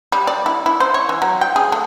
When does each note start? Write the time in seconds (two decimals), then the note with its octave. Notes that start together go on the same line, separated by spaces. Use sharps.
0.12 G3
0.27 D5
0.46 E4
0.66 E4
0.80 C5
0.94 C#5
1.09 E3
1.22 F#3
1.41 G5
1.56 G#4
1.72 A3